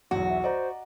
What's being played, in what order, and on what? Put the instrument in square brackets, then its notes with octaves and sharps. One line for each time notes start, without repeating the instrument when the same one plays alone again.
[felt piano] B1 E2 [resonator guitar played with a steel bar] F#4
[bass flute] E5
[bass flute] C5 [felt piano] D5 D#5 A#5